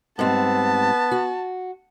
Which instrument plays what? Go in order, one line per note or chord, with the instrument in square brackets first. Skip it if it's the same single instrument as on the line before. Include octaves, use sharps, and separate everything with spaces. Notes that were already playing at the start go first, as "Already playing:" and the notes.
[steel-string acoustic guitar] G#2 G3 C4 [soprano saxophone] B3 [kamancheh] A5
[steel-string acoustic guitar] F#4